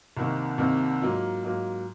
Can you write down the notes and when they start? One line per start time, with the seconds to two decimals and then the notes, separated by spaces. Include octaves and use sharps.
0.17 C2 C3 D#3 A#3
0.58 C2 C3 D#3 A#3
1.02 G#2 F#3 A#3 F4
1.43 G#2 F#3 A#3 F4